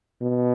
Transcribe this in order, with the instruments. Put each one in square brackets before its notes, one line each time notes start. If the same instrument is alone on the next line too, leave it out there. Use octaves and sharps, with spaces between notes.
[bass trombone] B2